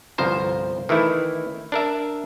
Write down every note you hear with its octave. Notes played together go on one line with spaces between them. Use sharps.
G1 C2 F3 C5 A#5
D#3 E3 A3 E4
D4 A#4 E5